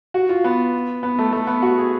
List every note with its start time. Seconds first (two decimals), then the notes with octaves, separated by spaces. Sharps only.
0.14 F#4
0.29 F4
0.44 B3
1.03 B3
1.19 A3
1.33 A3
1.47 B3
1.62 F#4
1.78 G#4